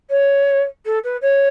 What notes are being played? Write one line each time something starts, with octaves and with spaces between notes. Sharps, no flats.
C#5
A4
B4
C#5